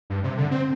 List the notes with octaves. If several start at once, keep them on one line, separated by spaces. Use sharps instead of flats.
G2
C3
D3
C4